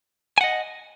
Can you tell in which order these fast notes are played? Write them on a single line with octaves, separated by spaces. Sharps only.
G#5 F#5 D#5